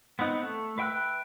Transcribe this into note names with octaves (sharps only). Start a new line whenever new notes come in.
B3 C4 D#4 F#5
A3
B4 E5 G5 E6 F#6